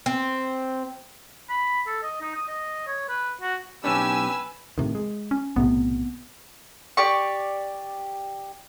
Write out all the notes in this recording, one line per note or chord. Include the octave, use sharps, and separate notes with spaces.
C4
B5
A4
D#5
D#4
D#6
D#5
C#5
B4
F#4
B1 C#4 D4 G4 B4 G#5 E6
A2 C3 D#3
G#3
C#4
B1 A2 C3 B3
G4 D5 C#6